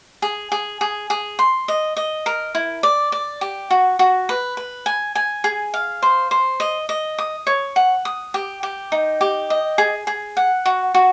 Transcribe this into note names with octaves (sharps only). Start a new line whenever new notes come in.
G#4
G#4
G#4
G#4
C6
D#5
D#5
A#4
E4
D5
D5
G4
F#4
F#4
B4
B4
G#5
G#5
G#4
F5
C5
C5
D#5
D#5
D#6
C#5
F#5
D#6
G4
G4
D#4
G4
D#5
G#4
G#4
F#5
F#4
F#4